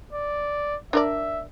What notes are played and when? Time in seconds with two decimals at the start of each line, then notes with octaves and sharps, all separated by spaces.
0.13 D5
0.93 D4 A#4 D5 E5